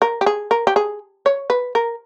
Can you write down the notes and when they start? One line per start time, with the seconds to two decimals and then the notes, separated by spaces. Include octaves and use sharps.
0.02 A#4
0.21 G4
0.26 G#4
0.51 A#4
0.67 G4
0.76 G#4
1.26 C#5
1.50 B4
1.75 A#4